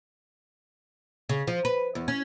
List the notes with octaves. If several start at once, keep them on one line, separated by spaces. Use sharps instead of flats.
C#3
F3
B4
E2
C#4